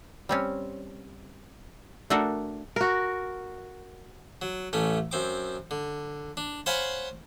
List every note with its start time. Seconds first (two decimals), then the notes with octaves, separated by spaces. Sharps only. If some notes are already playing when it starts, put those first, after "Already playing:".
0.29 G3 C4 C#4
2.10 A3 D4 F#4 A4 A#4
2.76 F#4 A#4
4.42 F#3
4.73 A1 A3 C#4
5.11 F#2 C4 D6
5.71 D3
6.37 D4
6.66 C5 C#5 F5 F#5 G#5 B5